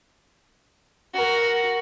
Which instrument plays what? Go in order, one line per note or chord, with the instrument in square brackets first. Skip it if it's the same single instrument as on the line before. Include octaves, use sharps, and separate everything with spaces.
[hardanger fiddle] F#4 A#4